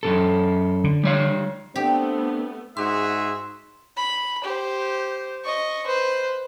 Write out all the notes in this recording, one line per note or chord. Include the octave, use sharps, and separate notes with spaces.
F#2 C#3 A4
D3
G3 C#5 F5
A3 B3 C4 D4 G4
G#2 F#4 G#4 E5 C6
B5
G4 C5
D#5 C#6
B4 C5